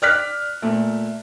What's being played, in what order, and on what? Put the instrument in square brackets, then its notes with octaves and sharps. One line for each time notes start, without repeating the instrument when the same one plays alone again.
[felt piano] D5 F6 F#6 B6
A#2 A3